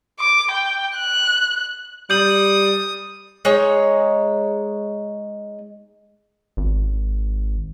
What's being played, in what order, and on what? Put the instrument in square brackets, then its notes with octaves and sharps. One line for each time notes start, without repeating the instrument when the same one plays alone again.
[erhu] D6
G5
F#6
[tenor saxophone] G3 [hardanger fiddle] D#6 [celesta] G6 F#7
[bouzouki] G#3 D#4 C#5
[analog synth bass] G#1